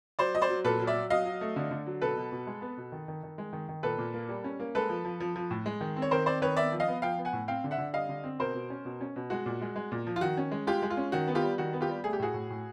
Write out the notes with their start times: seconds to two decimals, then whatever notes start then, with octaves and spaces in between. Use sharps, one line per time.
0.19 F#3 C5 D5
0.35 F#3 D#5
0.42 C5 D5
0.49 F#3
0.64 A#2 A4 B4
0.80 F#3
0.87 D5 E5
0.95 F#3
1.10 F#3 D#5 F5
1.25 F#3
1.41 A3
1.56 D3
1.71 D3
1.86 F#3
2.02 B2 A4 B4
2.17 B2
2.32 B2
2.47 G#3
2.62 B3
2.77 B2
2.92 D#3
3.08 D#3
3.23 D#3
3.38 G#3
3.53 D#3
3.69 D#3
3.83 A#2 A4 B4
3.98 A#2
4.14 A#3
4.29 G3
4.44 C#4
4.60 A#3
4.75 G#3 A4 B4
4.89 F3
5.05 F3
5.20 F3
5.36 F3
5.51 A2
5.66 G#3
5.81 D#3
5.96 C4
6.02 C#5
6.11 D#3 A#4 C5
6.26 C4 C5 D5
6.42 D#3 B4 C#5
6.57 B3 D5 E5
6.72 F3
6.80 D#5 F5
6.88 B3
7.02 F3 F5 G5
7.18 B3
7.25 F#5 G#5
7.33 A2
7.48 C4 F5 G5
7.64 D3
7.71 E5 F#5
7.78 D3
7.93 G3 D#5 F5
8.09 D3
8.24 C4
8.39 B2 A#4 C5
8.54 B2
8.70 C#4
8.85 B2
9.01 C#4
9.16 B2
9.30 G#3 F#4
9.46 A#2
9.62 G#3
9.76 G#3
9.92 A#2
10.07 F3
10.16 F4
10.21 D#3 F#4
10.37 C#4
10.52 G#3
10.67 G#3 F4 G4
10.82 G#3
10.90 F4
10.97 C#4
11.12 D#3 F#4
11.28 B3
11.35 F4 G4
11.43 G3
11.58 D#3 F#4
11.73 B3
11.81 F4 G4
11.89 G3
12.04 A3 G#4
12.13 G4
12.20 A2 F#4 G#4
12.34 A2
12.50 A2